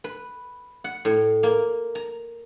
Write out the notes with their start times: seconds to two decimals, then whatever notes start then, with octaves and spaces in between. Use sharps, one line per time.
0.04 B4
0.84 F#5
1.05 A2
1.43 A#3
1.95 A#5